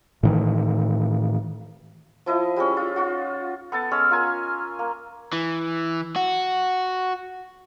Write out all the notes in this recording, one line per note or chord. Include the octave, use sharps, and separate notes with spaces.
A2 D#3 E3
F3 E4 D#5
G3 G#3 C#4
F4
D#4 F4 F#4
B3 A4 A5
G#3 C#4 E6
F4 A#4 G#5
A#3
E3
F#4